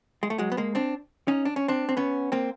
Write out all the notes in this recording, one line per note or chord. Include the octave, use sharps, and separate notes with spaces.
G#3
A3
F#3 G#3
B3
G#3 A#3
C4 D4
C#4 D#4
D4
C#4
C4 D4
C4
B3 C#4
A#3 C4